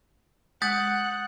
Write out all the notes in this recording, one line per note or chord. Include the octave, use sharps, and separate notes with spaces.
G#3 F#5 D#6 G6 A6